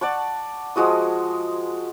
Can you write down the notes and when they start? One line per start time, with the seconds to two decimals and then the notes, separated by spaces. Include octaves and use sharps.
0.01 D5 F#5 A5 C#6
0.76 F3 G#3 F#4 D#6